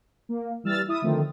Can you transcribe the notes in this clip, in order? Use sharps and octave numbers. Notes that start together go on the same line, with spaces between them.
A#3
E3 G3 E6 F6 A6
E4 E5 D#6
D3 D#3 F3 A3 C4